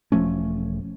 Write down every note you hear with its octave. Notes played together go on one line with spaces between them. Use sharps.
E1 F3 A3 C#4